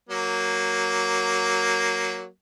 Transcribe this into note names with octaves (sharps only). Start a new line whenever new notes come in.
F#3 A#3